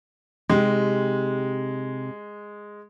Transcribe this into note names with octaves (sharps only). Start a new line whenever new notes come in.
C3 G#3 D#4 G4